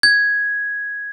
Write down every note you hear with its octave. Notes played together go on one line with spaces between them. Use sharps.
G#6